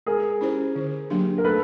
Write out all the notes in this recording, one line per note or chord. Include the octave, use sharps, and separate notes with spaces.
G#3 G#4 A#4
C#4 E4 G4 C5
D3
F#3 A#3 D4 G4
A#4
A3 A4 B4